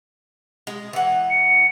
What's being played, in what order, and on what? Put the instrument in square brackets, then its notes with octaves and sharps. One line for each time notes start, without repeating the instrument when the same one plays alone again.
[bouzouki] G#3
E3 F#5
[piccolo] C#7